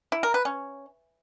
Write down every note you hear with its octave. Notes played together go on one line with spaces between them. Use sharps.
E4
A#4
B4
C#4